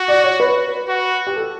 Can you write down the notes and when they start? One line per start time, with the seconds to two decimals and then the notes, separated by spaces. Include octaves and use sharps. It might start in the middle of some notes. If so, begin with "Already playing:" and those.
Already playing: F#4
0.08 D5
0.24 C#5
0.40 B4
0.88 F#4
1.27 G4
1.36 A4